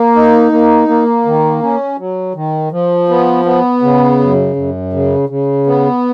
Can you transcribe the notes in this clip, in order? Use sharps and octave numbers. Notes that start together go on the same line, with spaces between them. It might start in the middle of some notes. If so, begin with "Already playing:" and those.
Already playing: A#3
D#4
A#3
A#3
D#3
C#4
F#3
D#3
F3
B3
B3
C#3
F#2
F#2
C#3
C#3
B3